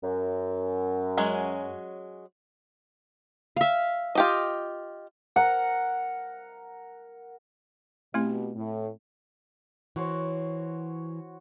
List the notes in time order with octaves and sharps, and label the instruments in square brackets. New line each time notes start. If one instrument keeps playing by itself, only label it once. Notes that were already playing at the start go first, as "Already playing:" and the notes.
[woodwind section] F#2
[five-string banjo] F#3 G#3 C#4
[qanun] E5 F5
[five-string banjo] F4 G4 D#5
[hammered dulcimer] A#4 F#5 A#5
[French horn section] B2 G4 [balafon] A3 C4 E4
[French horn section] A2
[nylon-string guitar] E3 [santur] F#4 C5 C#5